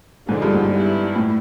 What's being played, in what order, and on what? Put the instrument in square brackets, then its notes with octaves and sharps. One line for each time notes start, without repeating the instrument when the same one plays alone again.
[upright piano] G#2 [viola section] D3 F3 G#3
[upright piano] G2
G#2
[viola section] G3 B3 E4
[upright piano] A2